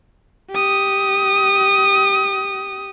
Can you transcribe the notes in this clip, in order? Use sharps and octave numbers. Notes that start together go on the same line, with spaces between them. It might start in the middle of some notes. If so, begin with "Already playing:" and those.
G4 D#6